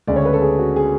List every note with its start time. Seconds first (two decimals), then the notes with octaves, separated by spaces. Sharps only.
0.07 D2 C#3 G#3 D5
0.16 C#5
0.25 B4
0.33 A4
0.42 G#4
0.59 F#4
0.76 G#4